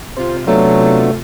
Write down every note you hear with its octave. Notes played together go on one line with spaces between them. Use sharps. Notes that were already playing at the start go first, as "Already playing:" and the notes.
C3 F4 C5
F#3 A3 B3 D4 F#4